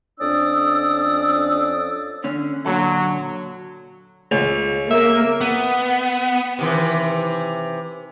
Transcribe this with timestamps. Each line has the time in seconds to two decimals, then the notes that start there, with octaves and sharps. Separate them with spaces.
0.19 F2 C#4 D4 D5 D#6 E6
2.24 D3 C#4
2.66 A#2 D3 F#3 A4
4.31 C#2
4.90 A#3 E5
5.41 B3
6.59 C3 D#3 E3